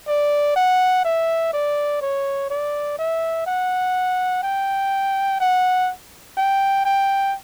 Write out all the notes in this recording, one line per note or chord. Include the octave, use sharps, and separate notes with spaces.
D5
F#5
E5
D5
C#5
D5
E5
F#5
G5
F#5
G5
G5